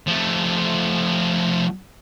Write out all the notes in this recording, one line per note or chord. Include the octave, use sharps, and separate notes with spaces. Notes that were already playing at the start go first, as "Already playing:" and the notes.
F3 A3